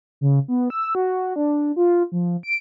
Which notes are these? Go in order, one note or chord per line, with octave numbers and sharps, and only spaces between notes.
C#3
B3
E6
F#4
D4
F4
F3
D7